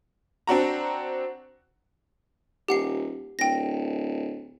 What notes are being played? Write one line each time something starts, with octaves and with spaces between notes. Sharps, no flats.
C4 D4 F#4 A#5
D#1 G4 F#5 C7
D1 G5 A#6